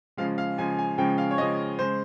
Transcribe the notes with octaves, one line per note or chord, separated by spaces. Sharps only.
C#3 F3 G#3 F5
F5
C#3 F3 G#3 G#5
G#5
C#3 F3 G#3 G5
F5
C#5
C#3 F3 G#3 D#5
C#3 G#3 C5